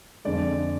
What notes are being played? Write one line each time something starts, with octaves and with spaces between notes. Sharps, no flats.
F2 D3 G#3 D5